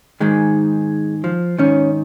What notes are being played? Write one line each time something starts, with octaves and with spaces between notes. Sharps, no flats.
G#2 D#3 G#3
F3
G#2 D#3 C#4